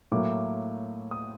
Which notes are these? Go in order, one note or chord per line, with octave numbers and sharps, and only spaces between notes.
A2 F#3 A#3 D6
D#6